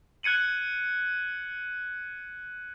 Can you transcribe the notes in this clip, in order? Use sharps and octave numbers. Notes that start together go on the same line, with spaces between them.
F#6 G#6 C#7 D#7 F#7